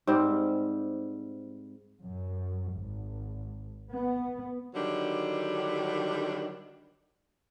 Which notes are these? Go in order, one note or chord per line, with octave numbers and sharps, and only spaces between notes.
G#2 G3 C4
F#2
G#1
B3
D3 D#3 F#3 G3 D4